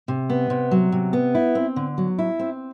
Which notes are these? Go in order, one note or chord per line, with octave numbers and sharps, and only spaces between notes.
C3
B3
C3
F#3
C3
B3
E4
C4
D3
F#3
E4
C4